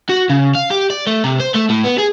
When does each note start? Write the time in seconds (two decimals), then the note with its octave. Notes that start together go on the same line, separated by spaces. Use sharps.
0.09 F#4
0.30 C#3
0.55 F5
0.70 G4
0.90 D5
1.07 A3
1.24 C3
1.40 C5
1.55 A3
1.70 A2
1.85 B3
1.99 G#4